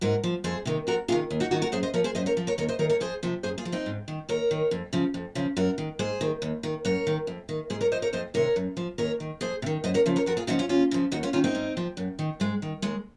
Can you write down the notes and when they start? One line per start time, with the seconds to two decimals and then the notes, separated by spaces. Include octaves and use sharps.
0.01 G#2 F#4 A#4
0.24 F3
0.44 F2 G#4 C5
0.65 C3 D#3
0.87 F2 F#4 A#4
1.08 C3 D#3 F4 G#4
1.31 D#2
1.40 D#4 F#4
1.51 D#3 D#4 F#4
1.62 F#4 A#4
1.72 F#2 G#4 C5
1.83 C5 D#5
1.94 F3 A#4 C#5
2.04 G#4 C5
2.15 F#2 C5 D#5
2.26 A#4 C#5
2.37 F3
2.47 A#4 C#5
2.58 D#2 A#4 C#5
2.69 C5 D#5
2.79 D#3 A#4 C#5
2.90 A#4 C#5
3.00 F2 G#4 C5
3.23 C3 F3
3.43 F#2 G#4 C5
3.58 F4 G#4
3.65 F3
3.72 C4 D#4
3.86 G#2
4.08 D#3
4.29 D#2 A#4 C#5
4.51 D#3
4.71 F2
4.93 C#3 F3
5.14 F2
5.35 C#3 F3
5.57 F#2 F#4 A#4
5.78 D#3
5.99 G#2 G#4 C5
6.21 D#3
6.42 D#2
6.63 D#3
6.85 F#2 A#4 C#5
7.07 D#3
7.27 F2
7.49 D#3
7.70 G#2 G#4 C5
7.81 A#4 C#5
7.92 F3 C5 D#5
8.02 A#4 C#5
8.13 F2 C5 D#5
8.34 C3 D#3 A#4 C#5
8.56 F#2
8.77 F3
8.98 D#2 A#4 C#5
9.20 D#3
9.41 F2 G#4 C5
9.62 C3
9.66 D#3
9.84 F#2 C5 D#5
9.94 A#4 C#5
10.06 C#3 F3
10.16 A#4 C#5
10.26 F2 F#4 A#4
10.37 F4 G#4
10.47 C#3 F3 D#4 F#4
10.59 C#4 F4
10.69 D#2 C#4 F4
10.91 C#3 F3
11.12 D#2 D#4 F#4
11.23 C#4 F4
11.33 D#3 C#4 F4
11.44 C4 D#4
11.55 G#2
11.77 F3
11.97 F#2
12.19 D#3
12.40 G#2 G#3
12.62 D#3
12.82 D#2 G#3